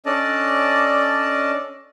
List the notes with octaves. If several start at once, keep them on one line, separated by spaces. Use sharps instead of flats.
C#4 D4 A4 D5 D#5 A5